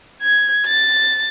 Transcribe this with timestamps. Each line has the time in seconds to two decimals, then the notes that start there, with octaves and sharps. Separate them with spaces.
0.22 G#6
0.66 A6